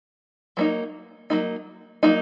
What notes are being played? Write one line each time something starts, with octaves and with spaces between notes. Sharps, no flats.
F#3 A#3 D#4
F#3 A#3 D#4
F#3 A#3 D#4